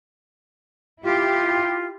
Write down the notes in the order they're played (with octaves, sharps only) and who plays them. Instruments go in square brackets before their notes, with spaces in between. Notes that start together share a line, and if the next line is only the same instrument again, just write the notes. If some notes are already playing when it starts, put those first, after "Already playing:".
[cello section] E4 G4 [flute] F4